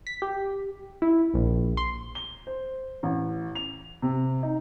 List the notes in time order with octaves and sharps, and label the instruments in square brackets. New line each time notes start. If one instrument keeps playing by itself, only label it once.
[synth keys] B6
G4
E4
A#1
C6
[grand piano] G7
C5
A1
F7
C3
D#4